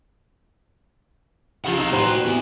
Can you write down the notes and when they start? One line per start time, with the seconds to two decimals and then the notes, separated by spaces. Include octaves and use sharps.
1.65 C#3 F3 G4 F#5
1.77 C3 D#4 F5
1.93 A2 B4 C5 A#5 C6
2.04 F#4 G4
2.25 B3 E4